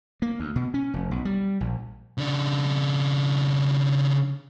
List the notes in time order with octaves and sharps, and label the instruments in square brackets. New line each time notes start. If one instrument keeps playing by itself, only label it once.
[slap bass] A#3
D2
B2
C#4
F1
B1
G3
A#1
[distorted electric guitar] C#3 D4